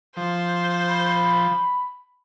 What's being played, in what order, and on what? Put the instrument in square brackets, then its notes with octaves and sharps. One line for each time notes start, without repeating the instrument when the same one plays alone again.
[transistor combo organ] F3 [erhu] C5
[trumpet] B5